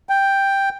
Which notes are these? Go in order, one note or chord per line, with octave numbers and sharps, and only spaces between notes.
G5